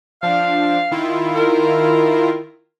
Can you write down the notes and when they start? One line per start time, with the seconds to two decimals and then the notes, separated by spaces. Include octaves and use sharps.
0.23 F3 D4 F5
0.91 D#3 E4 F4
1.36 A#4